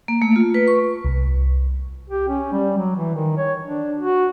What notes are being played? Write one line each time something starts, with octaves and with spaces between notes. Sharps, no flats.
A#3
A3
F4
B4
C#6
C2
G4
C#4
G3
F#3
E3
D#3
C#5
D4
F#4